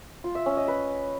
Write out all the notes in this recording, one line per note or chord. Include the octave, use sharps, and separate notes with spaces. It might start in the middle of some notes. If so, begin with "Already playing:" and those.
F4
E5
C#4
D#5
B4